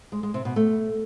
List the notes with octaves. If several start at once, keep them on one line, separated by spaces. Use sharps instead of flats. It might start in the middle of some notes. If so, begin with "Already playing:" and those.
G#3
G#3
C3
B2
A3